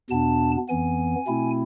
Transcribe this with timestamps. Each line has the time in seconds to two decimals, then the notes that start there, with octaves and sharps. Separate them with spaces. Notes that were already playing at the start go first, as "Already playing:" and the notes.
0.10 E2 B2 B3 D4 A5
0.69 F2 E3 B3 G#5
1.27 B2 A3 C4 E4